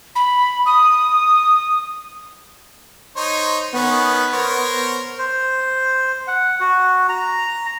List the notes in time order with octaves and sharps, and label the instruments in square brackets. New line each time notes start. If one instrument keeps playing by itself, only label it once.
[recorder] B5
D#6
[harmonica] D#4 C5 C#5
[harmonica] D#3 C#4 B4 [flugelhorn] B3
[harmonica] A#4 C5 C#5
[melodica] C5
F#5
F#4
A#5